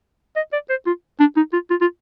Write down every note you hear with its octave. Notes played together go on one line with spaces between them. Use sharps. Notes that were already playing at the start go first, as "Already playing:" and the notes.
D#5
D5
C5
F4
D4
D#4
F4
F4
F4